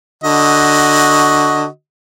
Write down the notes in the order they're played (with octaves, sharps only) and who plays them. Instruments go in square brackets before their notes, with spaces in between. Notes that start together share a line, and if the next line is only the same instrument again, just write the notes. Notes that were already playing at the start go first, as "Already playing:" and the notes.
[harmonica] D3 F#4 D#5